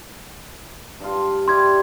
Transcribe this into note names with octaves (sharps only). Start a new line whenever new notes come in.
G2 F4
G3 E4 C6 G#6